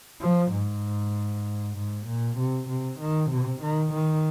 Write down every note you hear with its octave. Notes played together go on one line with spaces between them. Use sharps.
F3
G#2
G#2
A#2
C3
C3
D#3
C3
D#3
D#3